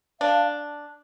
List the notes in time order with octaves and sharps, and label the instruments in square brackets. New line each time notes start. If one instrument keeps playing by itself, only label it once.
[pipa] D4 [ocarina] F5